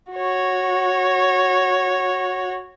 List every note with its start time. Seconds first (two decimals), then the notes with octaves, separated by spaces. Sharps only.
0.13 F#4 C#5